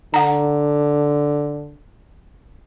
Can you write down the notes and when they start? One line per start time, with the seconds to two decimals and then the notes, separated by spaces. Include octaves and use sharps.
0.14 D3 F#5 A#5